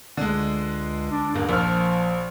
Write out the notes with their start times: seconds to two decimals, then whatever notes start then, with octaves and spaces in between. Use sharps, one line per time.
0.17 C#2 D3 G#3
1.11 D4
1.34 D#1 G2 A#3
1.49 A#1 F3 F6